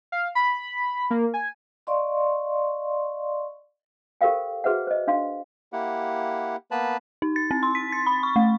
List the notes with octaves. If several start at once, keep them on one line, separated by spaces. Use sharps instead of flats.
F5
B5
A#3
G#5
D5 D#5 F5 C6 C#6
G4 A4 A#4 C5 F5 G5
F#4 G#4 B4 C5 E5 F#5
C5 D#5
D4 F5 C6
A#3 E4 G4 F#5
A#3 B3 B4 A5 B5
D#4
A6
C4
C6
B6
A6
B5
C#6
A3